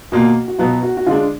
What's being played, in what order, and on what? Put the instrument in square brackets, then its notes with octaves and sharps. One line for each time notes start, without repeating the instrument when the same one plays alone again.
[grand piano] B2 A#3 F4 [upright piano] F#4
[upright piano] F#4
[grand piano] B2 F#3 B3 [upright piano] F4
[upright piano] F#4
F#4
[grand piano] D3 G#3 D4 [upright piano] F4